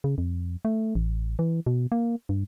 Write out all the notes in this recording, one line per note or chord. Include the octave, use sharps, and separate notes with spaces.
C#3
F2
A3
A1
E3
B2
A#3
G2